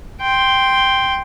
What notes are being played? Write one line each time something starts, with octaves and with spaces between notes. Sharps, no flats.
G5 C6